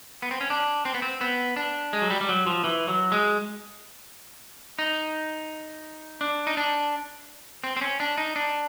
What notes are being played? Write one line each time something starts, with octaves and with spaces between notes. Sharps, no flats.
B3
C4
C#4
D4
C4
B3
C4
B3
D4
G#3
F#3
G3
G3
F#3
F3
E3
F#3
G#3
D#4
D4
D#4
D4
C4
C4
C#4
D4
D#4
D4